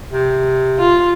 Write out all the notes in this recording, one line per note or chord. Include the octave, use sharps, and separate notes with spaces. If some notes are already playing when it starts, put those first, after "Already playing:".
C3
F4